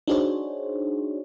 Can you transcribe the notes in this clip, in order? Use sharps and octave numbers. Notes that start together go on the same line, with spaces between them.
D4 D#4 F#4 G#4 C5 C#5